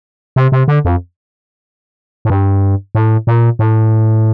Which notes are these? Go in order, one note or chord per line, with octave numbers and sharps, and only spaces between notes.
C3
C3
D3
F2
A2
G2
A2
A#2
A2